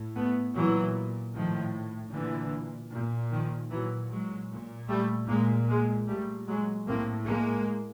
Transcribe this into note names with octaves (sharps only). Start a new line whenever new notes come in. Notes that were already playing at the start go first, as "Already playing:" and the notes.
Already playing: A2
A3 B3
A#2 E3 F#3
A2 D#3 F3
A#2 D3 E3
A#2
D#3 F3
A#2 E3 F#3
F#3 G#3
A#2
G3 A3
A#2 G#3 A#3
G#3 A#3
A#2 G3 A3
F#3 G#3
A2 A#3 C4
G#3 A#3